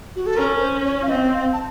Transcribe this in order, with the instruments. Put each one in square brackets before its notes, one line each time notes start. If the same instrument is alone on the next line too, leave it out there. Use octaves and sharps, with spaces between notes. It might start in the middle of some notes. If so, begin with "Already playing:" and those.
[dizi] F#4
A4
[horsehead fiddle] C#4 [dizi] A#4
[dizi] C5
C#5
F5
[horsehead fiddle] C4 [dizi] D#5
[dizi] F5
A5